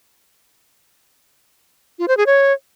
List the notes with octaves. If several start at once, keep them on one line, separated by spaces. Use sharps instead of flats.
F4
C5
G#4
C#5